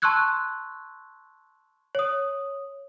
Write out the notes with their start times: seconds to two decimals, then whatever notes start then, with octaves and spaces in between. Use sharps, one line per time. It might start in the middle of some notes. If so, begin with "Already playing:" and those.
0.02 A5 C6 C#6 E6 F#6 G#6
1.95 C#5 D#6